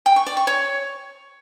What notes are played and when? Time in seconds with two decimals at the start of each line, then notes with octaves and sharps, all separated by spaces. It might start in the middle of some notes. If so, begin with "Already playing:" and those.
0.06 G5
0.16 C#6
0.27 D5
0.37 C#6
0.47 C#5